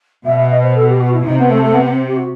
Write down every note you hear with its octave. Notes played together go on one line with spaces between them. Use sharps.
B2 E5
E5
D#5
C5
A4
G4
F#4
E4
C3 D#4
B3
A3
A3
B3
B3
C4
G4
F#4